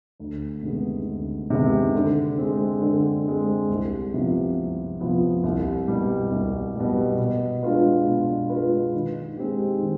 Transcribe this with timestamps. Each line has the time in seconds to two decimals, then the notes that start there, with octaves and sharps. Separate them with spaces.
0.20 D2
0.63 C3 D#3 G#3 B3
1.07 D2
1.50 C3 D#3 G#3 B3
1.94 D3
2.38 G#3 C4
2.81 D3
3.26 G#3 C4
3.70 C2
4.12 C3 F3 B3
4.57 C2
5.00 C3 F3 B3
5.44 C2
5.88 B2 G3
6.32 C2
6.76 B2 G3
7.18 B2
7.63 G#3 D4 F4 B4
8.06 B2
8.50 G#3 D4 F4 B4
8.94 D#3
9.37 G#3 C4 D#4 G4
9.82 D#3